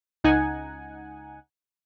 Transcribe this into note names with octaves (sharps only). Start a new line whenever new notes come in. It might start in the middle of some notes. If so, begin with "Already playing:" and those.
C#2 D#4 F#5 G#5